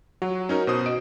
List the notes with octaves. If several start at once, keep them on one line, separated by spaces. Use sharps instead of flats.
F#3 F#4
C#4 D#4 A#4
B2 C5 D#6
D#5 D7